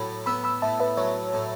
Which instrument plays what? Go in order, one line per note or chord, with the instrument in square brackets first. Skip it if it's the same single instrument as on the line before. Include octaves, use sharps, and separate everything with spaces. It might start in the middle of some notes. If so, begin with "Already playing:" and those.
Already playing: [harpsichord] A2 F#3 [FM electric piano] B5
[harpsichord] B3 [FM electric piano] B5 E6
[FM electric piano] B5 E6
[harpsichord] A2 [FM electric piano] E5 A5
[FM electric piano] B4 E5
[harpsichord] F#3 [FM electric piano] C#5
[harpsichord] A2